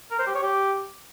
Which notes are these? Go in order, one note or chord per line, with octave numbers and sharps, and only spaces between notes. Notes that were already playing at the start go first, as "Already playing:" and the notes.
A#4
C5
G4
C#5
G4